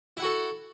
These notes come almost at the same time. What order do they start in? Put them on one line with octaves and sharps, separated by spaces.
E4 F#5 F#4 A4